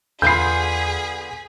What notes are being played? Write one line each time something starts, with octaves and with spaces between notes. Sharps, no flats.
E2 D3 B3 F4 G#4 G6 B6 C7